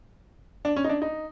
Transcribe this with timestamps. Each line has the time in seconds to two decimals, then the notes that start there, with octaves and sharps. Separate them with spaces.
0.65 D4
0.76 C#4
0.84 D#4
0.89 D4
1.02 D#4